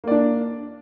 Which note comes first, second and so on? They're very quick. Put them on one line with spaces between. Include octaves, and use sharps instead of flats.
A#3 D5 D4